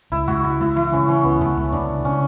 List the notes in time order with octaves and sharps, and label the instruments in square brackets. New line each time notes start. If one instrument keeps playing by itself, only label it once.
[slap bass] C#2 [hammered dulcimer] E4
[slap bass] C#2 [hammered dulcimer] F#4
[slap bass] C#2 [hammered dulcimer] E4
[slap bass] C#2 [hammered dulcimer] E4
[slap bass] E3 [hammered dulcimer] E4
[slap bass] C#3 [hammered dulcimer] C#4
[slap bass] E3 [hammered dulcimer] C#4
[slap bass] C#2 [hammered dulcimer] B3
[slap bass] C#2 [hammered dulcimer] A3
[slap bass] C#2
[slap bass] C#2 [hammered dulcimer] D4
[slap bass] C#3
[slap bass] C#3 [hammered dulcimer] C#4